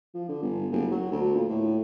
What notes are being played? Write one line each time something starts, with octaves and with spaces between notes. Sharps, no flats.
F3
D3
G1
F#1
F#3
D2
A#2
A2